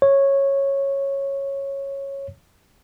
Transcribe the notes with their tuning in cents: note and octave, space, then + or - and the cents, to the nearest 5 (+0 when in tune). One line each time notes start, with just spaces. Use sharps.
C#5 -10